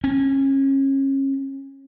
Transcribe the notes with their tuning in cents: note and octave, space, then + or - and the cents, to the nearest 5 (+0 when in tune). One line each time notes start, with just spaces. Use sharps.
C#4 -30